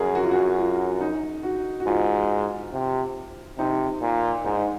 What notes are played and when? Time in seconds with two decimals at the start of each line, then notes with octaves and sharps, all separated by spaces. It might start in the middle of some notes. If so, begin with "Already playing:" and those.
Already playing: F#2 G#4 A#4
0.15 F#4
0.24 F4
0.31 F#4
0.58 F4
1.01 D#4
1.43 F#4
1.80 F#4
1.86 G#2 F4
2.72 C3
3.58 C3 D#4
4.01 A#2
4.44 G#2 D#4